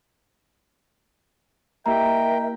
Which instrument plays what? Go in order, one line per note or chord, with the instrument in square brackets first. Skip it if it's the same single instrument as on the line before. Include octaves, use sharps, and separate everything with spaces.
[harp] A#3 E4 G4 [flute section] A#4 D#5 E5 [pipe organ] G5 [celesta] A#5